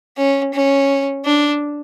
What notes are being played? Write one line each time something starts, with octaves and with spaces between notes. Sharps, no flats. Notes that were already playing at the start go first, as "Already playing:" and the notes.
C#4
C#4
D4